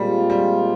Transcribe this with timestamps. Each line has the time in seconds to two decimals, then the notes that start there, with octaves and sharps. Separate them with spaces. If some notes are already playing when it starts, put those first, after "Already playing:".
Already playing: A#2 G3 G#3 C4 F4
0.30 G3